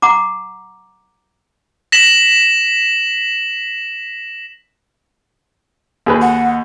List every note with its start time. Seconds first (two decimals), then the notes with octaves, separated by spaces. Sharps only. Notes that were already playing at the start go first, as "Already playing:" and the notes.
0.02 F#5 A#5 D6
1.92 A#6 B6 E7 F#7
6.06 D#2 G#4 B4
6.22 F#5